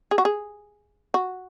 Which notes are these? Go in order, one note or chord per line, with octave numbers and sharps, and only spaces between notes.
G#4
F#4
G#4
F#4